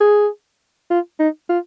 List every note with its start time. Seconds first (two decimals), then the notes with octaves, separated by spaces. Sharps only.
0.01 G#4
0.91 F4
1.20 D#4
1.49 F4